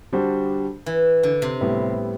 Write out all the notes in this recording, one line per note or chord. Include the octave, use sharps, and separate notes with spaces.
D3 G3 D4 F#4 C5
E3
D3
C3
A2 G3 B3 E4